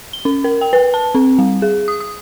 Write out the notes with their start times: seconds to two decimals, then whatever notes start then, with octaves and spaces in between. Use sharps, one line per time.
0.13 G7
0.25 C#4
0.44 A#4
0.61 G5
0.73 B4
0.94 A5
1.15 C4
1.38 G3
1.62 G#4
1.88 D#6
2.01 D#6